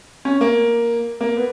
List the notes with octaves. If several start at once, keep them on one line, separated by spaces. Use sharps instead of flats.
C#4
A#3
A#3
B3